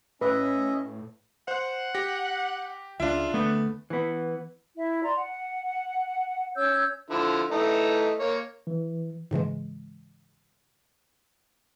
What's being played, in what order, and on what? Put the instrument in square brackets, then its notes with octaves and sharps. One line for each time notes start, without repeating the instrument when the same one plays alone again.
[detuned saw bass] A2 [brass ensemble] C#4 [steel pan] B4 [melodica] D#5 E5
[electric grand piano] C5 F#6 [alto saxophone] F#5
[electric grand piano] G4 A#6
[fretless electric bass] C#2 [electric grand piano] D4 E5 [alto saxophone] F4
[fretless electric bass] D2 A3 [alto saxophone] B3
[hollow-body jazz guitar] E3 B3
[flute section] E4 E5
D5 A#5 C6
F#5
C#4 C#5 E6 G6
[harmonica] D3 F3 E4
E3 A3 D#4
A#3 C#5
[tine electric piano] E3
[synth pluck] G#2 C#3 E3 G#3